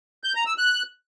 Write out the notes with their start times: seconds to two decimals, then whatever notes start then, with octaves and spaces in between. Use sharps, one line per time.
0.24 G6
0.35 A#5
0.46 E6
0.58 F#6